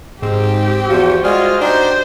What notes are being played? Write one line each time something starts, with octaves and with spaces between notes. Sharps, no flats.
G#2 C4 G4
E2 F3 F#4 C5
G3 G#3 F4 G#4 F6
D4 D#4 G4 C5